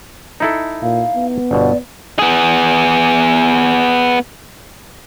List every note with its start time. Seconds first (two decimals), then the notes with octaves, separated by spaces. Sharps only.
0.40 D#4 E4 A4
0.82 A#2 F5
1.15 B3
1.51 G1 B2 D5
2.19 B3 G#4